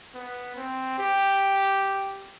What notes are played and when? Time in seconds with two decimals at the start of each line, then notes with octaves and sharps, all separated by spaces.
0.14 B3
0.56 C4
0.98 G4